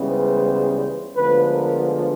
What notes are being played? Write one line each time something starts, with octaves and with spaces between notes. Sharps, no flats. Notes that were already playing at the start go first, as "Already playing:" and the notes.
Already playing: C#2 C#3 E3 G3 B3
C5
D2 D3 F3 G#3 B3 B4
A#4